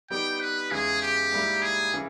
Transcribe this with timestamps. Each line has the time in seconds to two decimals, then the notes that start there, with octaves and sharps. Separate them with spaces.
0.10 G3 B3 D#4 G4 G5
0.41 B4
0.71 E2 C#3 E3 G#3 G#4
1.02 G4
1.32 G#2 G3 A#3 E4
1.62 G#4
1.94 C#3 E3